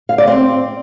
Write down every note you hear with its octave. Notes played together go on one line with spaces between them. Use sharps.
F5
D5
C4